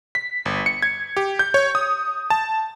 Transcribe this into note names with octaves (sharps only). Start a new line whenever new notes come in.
B6
G1
C#7
G#6
G4
G6
C#5
D#6
A5